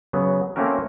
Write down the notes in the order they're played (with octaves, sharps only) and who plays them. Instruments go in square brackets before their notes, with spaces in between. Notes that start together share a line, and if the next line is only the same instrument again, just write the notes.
[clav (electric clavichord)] C#3 F#3 B3
A3 A#3 C4 C#4 F#4 A#4